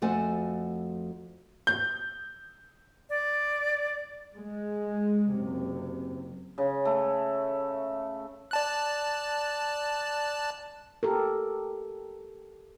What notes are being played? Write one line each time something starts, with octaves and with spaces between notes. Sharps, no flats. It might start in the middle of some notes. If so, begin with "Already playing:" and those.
F2 A3 F#4 A4 F#5 G#5
G6
D5
G#3
F#1 C3
C#3
A3
D5 A5 F#6
G4 A4 A#4